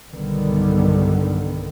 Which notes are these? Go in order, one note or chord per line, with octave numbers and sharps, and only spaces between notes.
B1 G2 D3 D#3 G3 B3